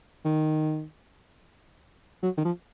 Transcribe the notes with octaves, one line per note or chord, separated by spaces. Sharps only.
D#3
F#3
D#3
F3